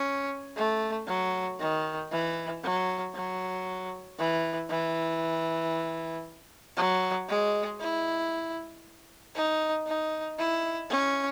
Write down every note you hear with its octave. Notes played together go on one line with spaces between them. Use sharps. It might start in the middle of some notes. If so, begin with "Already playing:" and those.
Already playing: C#4
A3
F#3
D#3
E3
F#3
F#3
E3
E3
F#3
G#3
E4
D#4
D#4
E4
C#4